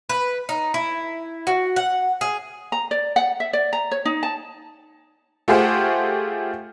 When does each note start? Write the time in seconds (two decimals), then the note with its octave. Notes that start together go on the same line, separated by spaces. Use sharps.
0.09 B4
0.49 D#4
0.74 E4
1.47 F#4
1.76 F#5
2.21 G#4
2.72 A#5
2.91 D5
3.16 F#5
3.40 E5
3.53 D5
3.73 A#5
3.91 C#5
4.05 D#4
4.23 A5
5.48 A3 F4 G4 G#4 C5 F#5